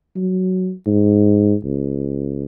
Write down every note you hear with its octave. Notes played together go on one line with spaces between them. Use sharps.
F#3
G#2
C#2